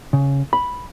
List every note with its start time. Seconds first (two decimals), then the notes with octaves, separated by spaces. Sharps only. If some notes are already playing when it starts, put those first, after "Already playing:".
0.13 C#3
0.53 B5